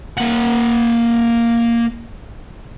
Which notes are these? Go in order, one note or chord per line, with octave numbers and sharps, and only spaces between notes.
A#3 F#5